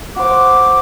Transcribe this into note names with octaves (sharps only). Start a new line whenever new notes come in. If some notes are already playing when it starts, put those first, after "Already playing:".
F#4 C5 D6